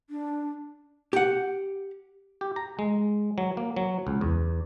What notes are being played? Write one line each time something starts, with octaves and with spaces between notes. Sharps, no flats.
D4
G4 F#5
G4
A#5
G#3
F#3
A#3
F#3
C#2
E2